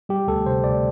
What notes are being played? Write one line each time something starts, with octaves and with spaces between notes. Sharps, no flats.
G3 G4
D2 A4
C3 C5
D2 D5